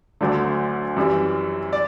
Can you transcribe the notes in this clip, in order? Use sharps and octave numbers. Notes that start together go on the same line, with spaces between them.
D2 D3 F#3 A3
F#2 E3 G3
D5